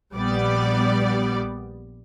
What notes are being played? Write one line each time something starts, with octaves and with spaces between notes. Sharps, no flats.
A#1 G3 B3 D5